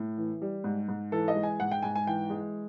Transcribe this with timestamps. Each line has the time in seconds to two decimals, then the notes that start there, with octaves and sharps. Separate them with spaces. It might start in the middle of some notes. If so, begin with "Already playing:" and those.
Already playing: A2
0.17 E3
0.42 G3
0.64 G#2
0.88 G#2
1.12 E3 A4
1.28 D#5
1.35 G#3
1.43 G#5
1.60 G#2 F#5
1.72 G5
1.83 G#2 G#5
1.95 G#5
2.07 E3 G5
2.30 G#3